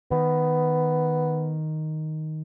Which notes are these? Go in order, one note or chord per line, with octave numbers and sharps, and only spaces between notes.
D#3 B3